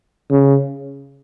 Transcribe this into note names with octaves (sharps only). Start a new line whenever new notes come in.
C#3